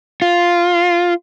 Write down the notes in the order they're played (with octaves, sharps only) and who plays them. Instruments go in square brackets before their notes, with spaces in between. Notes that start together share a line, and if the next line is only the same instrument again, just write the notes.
[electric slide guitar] F4